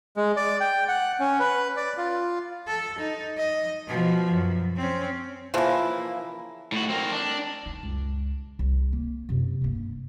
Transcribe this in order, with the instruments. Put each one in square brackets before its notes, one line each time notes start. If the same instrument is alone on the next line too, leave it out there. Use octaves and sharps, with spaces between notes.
[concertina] G#3
D5
G5
F#5
C#4
B4
D5
F4
[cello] A4
D#4
D#5
B2 F3
F#2
C4 C#4
[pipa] C#3 E3 F3 [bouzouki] A#3 E4
[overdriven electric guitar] A2 F#4
C4 A#4
D4
[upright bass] D#4
C#2 F#2
C2
A#3
F#2 C3
G2 A#3